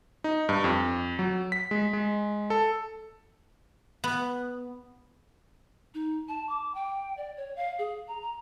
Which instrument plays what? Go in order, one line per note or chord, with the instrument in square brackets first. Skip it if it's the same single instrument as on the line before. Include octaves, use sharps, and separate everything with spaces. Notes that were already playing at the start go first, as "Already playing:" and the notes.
[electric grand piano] D#4
G2
F2
F#3
B6
G#3
G#3
A4
[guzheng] B3
[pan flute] D#4
A5
D6
G5
D5
C#5
F5
G#4
A#5
A#5